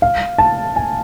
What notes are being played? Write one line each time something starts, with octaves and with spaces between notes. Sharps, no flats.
F5
A5
G#5